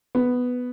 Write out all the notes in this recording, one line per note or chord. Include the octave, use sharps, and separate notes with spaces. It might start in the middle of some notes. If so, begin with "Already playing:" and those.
B3